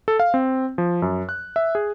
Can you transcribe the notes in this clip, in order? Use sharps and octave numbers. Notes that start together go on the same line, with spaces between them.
A4
F5
C4
F3
F#2
F#6
E5
G#4